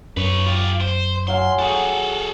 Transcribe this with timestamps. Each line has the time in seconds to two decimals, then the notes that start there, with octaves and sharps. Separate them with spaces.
0.17 F#2 B4 C#5
0.46 F4 G4
0.81 C5
1.28 F#3 F5 G#5 C6
1.59 F#4 G#4 A4